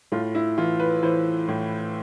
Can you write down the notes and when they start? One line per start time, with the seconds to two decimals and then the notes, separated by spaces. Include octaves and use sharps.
0.12 A2 F4
0.35 E4
0.58 E3 F4
0.80 B4
1.03 E3 C5
1.48 A2